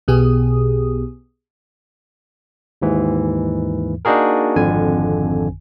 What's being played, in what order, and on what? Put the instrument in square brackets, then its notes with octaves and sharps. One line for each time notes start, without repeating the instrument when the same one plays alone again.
[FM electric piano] B1 B2 B3 G4 G#4 D#6
[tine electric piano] D#2 G#2 E3
A#3 D4 D#4 F#4 G#4 A#4
G#1 F2 D3 G#5